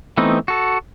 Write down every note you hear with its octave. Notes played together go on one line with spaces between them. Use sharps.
E3 A3 B3 C4 D#4
F#4 A4